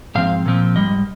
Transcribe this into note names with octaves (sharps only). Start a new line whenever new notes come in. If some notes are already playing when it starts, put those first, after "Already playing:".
G#2 F3 C4 F5
A#2 F3 C4
G#2 G3 D#5